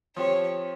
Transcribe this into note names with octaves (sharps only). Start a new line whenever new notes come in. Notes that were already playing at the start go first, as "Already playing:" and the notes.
F3 C4 G4 C#5